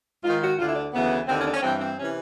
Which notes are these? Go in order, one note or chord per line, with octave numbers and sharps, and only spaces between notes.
G#2 D#3 F4
F#4
D2 D3 F4
E4
D4
D2 C#3 E3 B3
D#2 D3 C4
C#4
D4
C#4
G2 E3 C4
C4
C3 E3 C#4